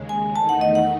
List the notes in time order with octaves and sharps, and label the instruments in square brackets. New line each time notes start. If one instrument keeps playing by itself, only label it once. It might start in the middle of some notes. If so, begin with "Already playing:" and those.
Already playing: [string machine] D#2 C#3 G#3
[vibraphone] G#5
[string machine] E2 D#3 A3 D#4 [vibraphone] A5
[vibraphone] F#5
D#5
F#5